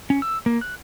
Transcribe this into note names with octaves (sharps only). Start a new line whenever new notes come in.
C#4
E6
A#3
F#6